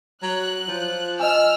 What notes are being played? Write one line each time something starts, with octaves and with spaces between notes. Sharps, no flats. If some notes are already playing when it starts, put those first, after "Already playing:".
F#3 F#6
F3
D#5 G#5 E6 F6